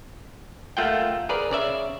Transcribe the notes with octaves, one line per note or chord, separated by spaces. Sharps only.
A3 A#3 F4 F#5 G5
G#4 A#4 B4 D5
C#3 D5 E5